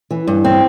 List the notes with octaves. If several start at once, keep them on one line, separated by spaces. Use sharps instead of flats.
E3
G2
C4